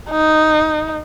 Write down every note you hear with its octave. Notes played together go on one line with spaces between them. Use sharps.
D#4